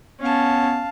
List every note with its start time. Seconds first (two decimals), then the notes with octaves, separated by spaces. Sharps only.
0.21 B3 C#4 F5 A5